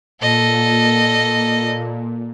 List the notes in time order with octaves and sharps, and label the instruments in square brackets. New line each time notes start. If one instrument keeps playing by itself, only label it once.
[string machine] A#2 [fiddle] A4 D#5